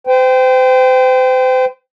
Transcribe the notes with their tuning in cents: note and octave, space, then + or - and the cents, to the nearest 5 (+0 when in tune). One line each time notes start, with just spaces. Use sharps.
C5 -35 G5 +0